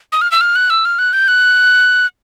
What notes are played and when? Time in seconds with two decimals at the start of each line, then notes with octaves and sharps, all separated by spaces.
0.12 D#6
0.21 F6
0.32 E6
0.41 F6
0.56 F#6
0.70 E6
0.85 F6
0.99 F#6
1.13 G6
1.28 F#6